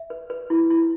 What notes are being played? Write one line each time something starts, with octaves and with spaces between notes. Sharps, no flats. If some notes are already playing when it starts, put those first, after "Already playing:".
Already playing: E5
B4
B4
E4
E4